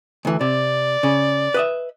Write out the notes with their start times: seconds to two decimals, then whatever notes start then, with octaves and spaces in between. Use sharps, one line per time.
0.25 D2 E3
0.41 C3 D5
1.03 C#3
1.54 B4 D#5 E5